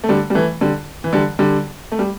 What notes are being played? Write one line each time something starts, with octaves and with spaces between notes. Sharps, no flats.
A3
D3 G3
G3
E3 A3
D3 G3
E3
D3 G3
D3 G3
A3
G3